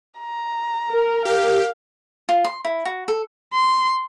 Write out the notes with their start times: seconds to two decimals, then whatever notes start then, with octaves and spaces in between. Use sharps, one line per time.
0.19 A#5
0.91 A#4
1.25 G4 F5
2.29 F4
2.44 C6
2.65 E4
2.85 F#4
3.08 A4
3.54 C6